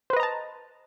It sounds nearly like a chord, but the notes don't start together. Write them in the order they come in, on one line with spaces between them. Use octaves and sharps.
C5 B4 D#5 A#5 A5